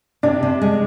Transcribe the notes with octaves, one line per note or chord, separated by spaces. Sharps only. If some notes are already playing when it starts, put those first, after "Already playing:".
C3 D4
C3
G#3